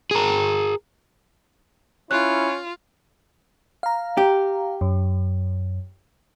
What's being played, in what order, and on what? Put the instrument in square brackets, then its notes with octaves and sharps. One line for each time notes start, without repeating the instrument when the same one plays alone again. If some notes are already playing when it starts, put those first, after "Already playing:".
[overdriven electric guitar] G#4 A#4
[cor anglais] C#4 [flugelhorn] E4 [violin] F4 [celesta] F#6
[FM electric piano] F5 A#5
[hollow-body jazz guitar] G4
[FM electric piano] F#2